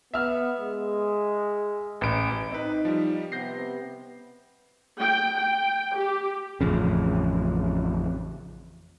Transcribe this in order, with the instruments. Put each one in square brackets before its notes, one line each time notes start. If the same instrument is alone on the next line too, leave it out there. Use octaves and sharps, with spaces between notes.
[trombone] B3 [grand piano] E5 F6
[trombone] G#3
[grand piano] A1 D7
[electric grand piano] C4 B4 [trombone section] D#4
[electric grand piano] F3 G3
[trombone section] C3 B3 [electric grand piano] G6 A#6 C7
[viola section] G5
G5
G4
[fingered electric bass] A1 F2 C#3